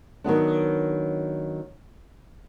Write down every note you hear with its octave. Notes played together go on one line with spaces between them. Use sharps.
D#3 F#3 B3 D4